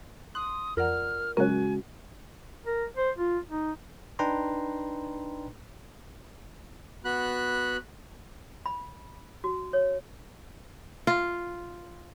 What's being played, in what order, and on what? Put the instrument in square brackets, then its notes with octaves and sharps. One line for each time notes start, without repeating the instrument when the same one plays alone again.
[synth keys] C6 [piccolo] D#6 [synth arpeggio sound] F#6
[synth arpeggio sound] F2 A#5 [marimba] F4 D5 F#5 [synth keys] A#4 [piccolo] F6
[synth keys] C#3 G#3 F#4 [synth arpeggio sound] F#3 A#4 [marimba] C#4 F#6 [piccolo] G#5
[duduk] A#4
C5
F4
D#4
[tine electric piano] D4 D#4 B4 G5 A#5 C6
[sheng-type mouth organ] B3 F#4 B5 F#6
[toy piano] B5
F#4
C#5
[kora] F4